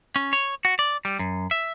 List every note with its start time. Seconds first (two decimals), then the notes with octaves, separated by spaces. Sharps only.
0.16 C#4
0.33 C#5
0.65 F#4
0.79 D5
1.05 G3
1.19 F#2
1.51 E5